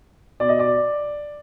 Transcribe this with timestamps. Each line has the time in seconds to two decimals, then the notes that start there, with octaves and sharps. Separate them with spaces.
0.40 B2 D5
0.49 D#5
0.59 D5